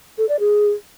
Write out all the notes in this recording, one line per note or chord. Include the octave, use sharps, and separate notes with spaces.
A4
D5
G#4